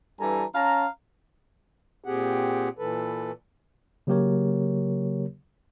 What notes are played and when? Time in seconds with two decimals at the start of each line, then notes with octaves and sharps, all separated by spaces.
0.20 G2 E3 G3 A4 G#5 A#5
0.55 C#4 F5 A5 A#5
2.04 A#2 C4 G4 G#4 F#5
2.79 A#2 E3 A4 B4
4.07 C#3 F#3 A#3 G4 A#4 C#5